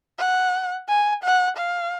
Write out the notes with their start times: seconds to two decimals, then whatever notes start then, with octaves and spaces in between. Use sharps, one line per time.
0.19 F#5
0.89 G#5
1.24 F#5
1.58 F5